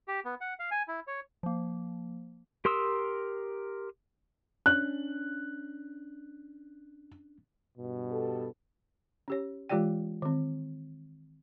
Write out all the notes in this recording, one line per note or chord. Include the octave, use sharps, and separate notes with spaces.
G4
B3
F#5
F5
G#5
E4
C#5
F3 A#3
G4 A#4 C6 D#6 E6
C#4 D4 F#6
G2 B2
B3 G4 A4
C#4 G4 C#5
E3 G#3 F4 G4 D5 G5
D#3 C4